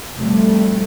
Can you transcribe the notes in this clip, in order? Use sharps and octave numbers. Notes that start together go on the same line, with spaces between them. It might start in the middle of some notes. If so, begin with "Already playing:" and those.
C3 F3 G3 A3